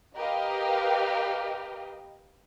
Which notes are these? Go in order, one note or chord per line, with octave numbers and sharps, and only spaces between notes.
G4 A#4 B4 D#5 F5 G5